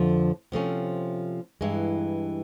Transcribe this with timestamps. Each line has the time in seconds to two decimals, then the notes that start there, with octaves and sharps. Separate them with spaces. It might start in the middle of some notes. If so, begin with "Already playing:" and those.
Already playing: F2 D3 F3 A3
0.52 C3 F3 A3 C#4
1.61 G2 E3 G#3